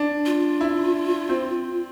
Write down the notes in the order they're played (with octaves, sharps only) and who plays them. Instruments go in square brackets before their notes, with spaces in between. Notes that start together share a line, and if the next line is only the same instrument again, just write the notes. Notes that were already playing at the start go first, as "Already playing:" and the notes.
Already playing: [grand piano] D4
[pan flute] F4
[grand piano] E4
C4